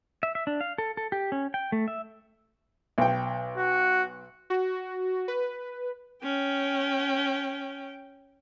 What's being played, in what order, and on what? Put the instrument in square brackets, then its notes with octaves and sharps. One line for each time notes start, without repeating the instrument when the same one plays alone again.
[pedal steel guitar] E5
E5
D4
F5
A4
A4
G4
C#4
G5
A3
E5
[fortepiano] B1 G5
[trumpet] F#4
[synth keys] F#4
B4
[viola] C#4 G5